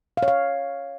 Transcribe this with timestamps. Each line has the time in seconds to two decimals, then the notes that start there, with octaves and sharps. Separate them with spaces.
0.17 F5
0.23 C#5
0.28 F5